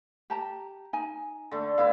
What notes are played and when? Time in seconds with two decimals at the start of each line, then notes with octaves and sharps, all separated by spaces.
0.30 G4 A5 A#5
0.93 D#4 G#5
1.51 D3 A3
1.78 A2 B3 E4 F5